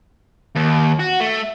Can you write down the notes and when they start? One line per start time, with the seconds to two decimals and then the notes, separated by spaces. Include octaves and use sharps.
0.55 D#2
1.00 F#4
1.20 A3